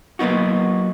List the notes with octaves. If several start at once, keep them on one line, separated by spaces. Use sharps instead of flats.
F#3 A#3 B3 D#4 F#4